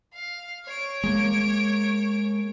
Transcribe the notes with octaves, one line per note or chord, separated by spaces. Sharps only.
F5
C#5 D7
G#3 A#3